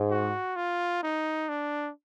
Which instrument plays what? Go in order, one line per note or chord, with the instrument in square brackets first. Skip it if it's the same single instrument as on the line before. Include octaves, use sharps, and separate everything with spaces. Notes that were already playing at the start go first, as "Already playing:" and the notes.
Already playing: [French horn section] G#2
[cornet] F#4
F4
D#4
D4